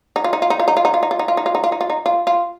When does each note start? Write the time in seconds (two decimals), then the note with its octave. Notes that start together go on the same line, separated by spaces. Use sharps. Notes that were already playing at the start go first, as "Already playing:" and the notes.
0.16 D#4
0.24 F4
0.33 D#4
0.42 F4
0.50 D#4
0.60 F4
0.68 D#4
0.77 F4
0.85 D#4
0.94 F4
1.03 D#4
1.11 F4
1.19 D#4
1.28 F4
1.37 D#4
1.46 F4
1.55 D#4
1.64 F4
1.72 D#4
1.81 F4
1.90 D#4
2.06 F4
2.27 F4